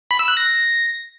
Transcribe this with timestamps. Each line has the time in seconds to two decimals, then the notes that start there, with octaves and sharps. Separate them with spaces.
0.11 B5
0.19 E6
0.28 F#6
0.37 A#6